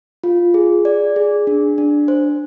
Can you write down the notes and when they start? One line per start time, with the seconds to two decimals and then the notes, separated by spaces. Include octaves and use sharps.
0.24 F4
0.54 G#4
0.85 D5
1.16 G#4
1.47 D4
1.78 D4
2.08 C5